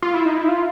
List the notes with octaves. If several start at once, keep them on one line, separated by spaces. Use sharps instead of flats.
F4
E4
D#4
E4
F4